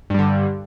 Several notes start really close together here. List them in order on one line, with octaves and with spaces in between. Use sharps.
G2 G3 D3